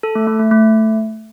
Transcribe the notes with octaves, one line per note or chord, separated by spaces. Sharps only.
A4
A3
A3
A3
A3